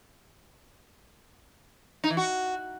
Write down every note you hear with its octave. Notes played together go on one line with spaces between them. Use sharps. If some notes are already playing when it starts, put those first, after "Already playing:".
D#4
E3
F#4